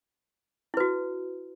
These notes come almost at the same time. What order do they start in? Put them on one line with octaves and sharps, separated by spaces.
E4 B4 F#4